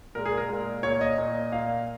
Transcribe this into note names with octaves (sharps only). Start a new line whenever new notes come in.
A#2 G#3 A#4
G#4
A#4
A#2 G#3
A#2 A#3 C#5
D#5
A#2 A#3
A#2 A#3 F5